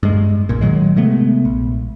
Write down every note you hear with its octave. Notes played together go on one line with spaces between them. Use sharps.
G2 G#3
A#1 A#2
A2 D#3 F#3 G#3
C3 G#3 A3 B3
A#1